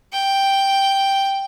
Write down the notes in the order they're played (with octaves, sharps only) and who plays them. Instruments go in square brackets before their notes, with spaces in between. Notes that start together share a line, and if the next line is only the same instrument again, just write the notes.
[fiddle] G5